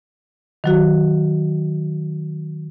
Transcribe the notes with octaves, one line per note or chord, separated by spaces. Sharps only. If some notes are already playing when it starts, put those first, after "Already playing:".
D#3 F#3 F#4